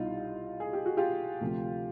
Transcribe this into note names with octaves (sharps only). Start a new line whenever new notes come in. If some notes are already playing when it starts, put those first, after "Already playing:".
Already playing: C2 B2 G3 D#4 F4
G#4
G4
F#4
F4 G4
D2 C3 F3 A3